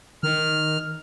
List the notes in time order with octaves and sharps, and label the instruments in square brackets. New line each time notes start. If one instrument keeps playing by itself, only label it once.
[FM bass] D#3 [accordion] F6